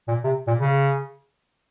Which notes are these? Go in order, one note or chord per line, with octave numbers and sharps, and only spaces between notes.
A#2
C3
A#2
C#3